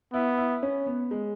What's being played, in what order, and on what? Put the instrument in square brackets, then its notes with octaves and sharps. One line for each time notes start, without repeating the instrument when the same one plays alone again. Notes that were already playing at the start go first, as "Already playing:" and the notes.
[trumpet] B3 [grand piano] E4
[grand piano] E4
C#4
B3
G#3